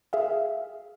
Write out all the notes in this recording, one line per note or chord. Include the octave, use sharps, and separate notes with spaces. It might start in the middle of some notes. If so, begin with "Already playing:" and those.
G#4 E5 F5